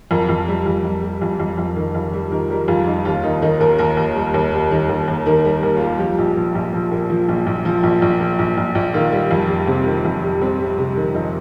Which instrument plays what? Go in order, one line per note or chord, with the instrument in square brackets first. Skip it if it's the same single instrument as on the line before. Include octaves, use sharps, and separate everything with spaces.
[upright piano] F2 A#4
F2
G3
F2
F2
G3
F2
F2
F2
D#3
F2
G3
D#3 A#4
G3 A#4
F2 F4
G3 D#4
D#2 F4
D#3 D#4
D#3 D#4
D#2 A#4
D#2 A#4
D#2
G3
D#2
G3
D#3
D#2
D#2
D#3 A#4
G3 A#4
D#2 A#4
F4
G3 G4
F3 G4
A#1
F3
A#1
F3
A#2
F3
A#1
A#1
F3
A#1
A#1
F3
A#1
A#1
A#1
D#3 F4
G3
F2
G3
C3 C4
D#3
F2
G3
G3 C4
G3
C3
D#3
F2 D#4